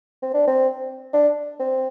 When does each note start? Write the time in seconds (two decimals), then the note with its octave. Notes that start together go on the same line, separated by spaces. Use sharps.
0.22 C4
0.34 D4
0.47 C4
1.14 D4
1.60 C4